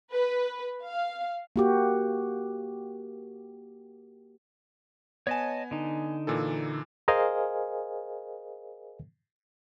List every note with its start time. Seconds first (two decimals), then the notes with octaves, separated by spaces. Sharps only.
0.12 B4
0.84 F5
1.56 A#3 F#4 G4
5.27 B3 C#5 D#5 G#5 A5
5.71 D3 D#4
6.27 A#2 E3 A4
7.08 G#4 A#4 C5 D#5 F5 G#5